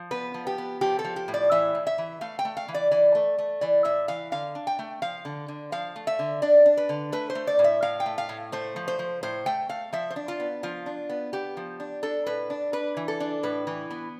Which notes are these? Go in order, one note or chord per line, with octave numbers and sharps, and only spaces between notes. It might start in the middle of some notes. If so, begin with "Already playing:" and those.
Already playing: F3
B3 B4
F3
G4
B3
F3 G4
A4
F3
G4
A2
D5
E3 E5
A2
E5
E3
A3 F5
G5
A3
F5
E3
D5
E3 D5
A3
A3
E3 D5
A2 E5
E3 F5
D3 F5
D4
G5
A3
F3 F5
D3
D3
F3 F5
A3
E5
D3
D4 D5
D4
B4
D3
A3 B4
C5
A3
D5
A2
E5
A2 F5
G5
A3
F5
A2
A3 C5
F3
C5
F3
A2 C5
A3 G5
A3 F5
F3 E5
C5
D4
F4
B3
F3 F4
D4
B3
B3 G4
F3
D4
D4 A4
A2 B4
D4
D4 B4
E3
A4
D4
A2 B4
E3
B3